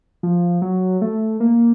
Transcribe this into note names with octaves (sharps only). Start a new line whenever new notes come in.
F3
F#3
A3
A#3